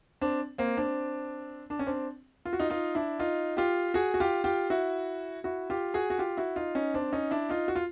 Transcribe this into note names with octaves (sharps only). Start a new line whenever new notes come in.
C4 D4
A#3 C4
C4 D4
D4
C#4
C4 D4
F4
F#4
D#4 F4
D#4 F4
D4 E4
D#4 F4
F4 G4
F#4 G#4
F#4
F4 G4
F4 G4
E4 F#4
E4 F#4
F4 G4
F#4 G#4
F#4
F4 G4
E4 F#4
D#4 F4
C#4 D#4
C4 D4
C#4 D#4
D4 E4
D#4 F4
F#4
F4